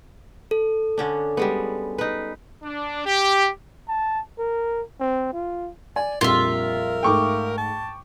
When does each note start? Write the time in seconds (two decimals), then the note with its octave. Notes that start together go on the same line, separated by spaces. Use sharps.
0.51 A4
0.98 D3 C#4 D4
1.37 G3 G#3 B3
1.98 D#4 B4
2.63 D4
3.05 G4
3.88 A5
4.38 A#4
5.00 C4
5.33 F4
5.96 D5 G#5
6.21 A#1 F2 G3 F4 A#4 E5
7.03 G#2 A3 G5 C#6 D6
7.58 A5